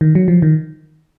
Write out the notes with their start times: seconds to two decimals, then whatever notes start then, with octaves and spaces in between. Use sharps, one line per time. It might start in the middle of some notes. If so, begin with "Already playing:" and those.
0.01 D#3
0.15 F#3
0.28 F3
0.42 D#3